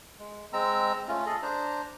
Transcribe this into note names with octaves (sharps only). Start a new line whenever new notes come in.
G#3
G#3 C4 A#5 E6
A3 C#4 F4
G#4 A4 D#5
D4 C5 A#5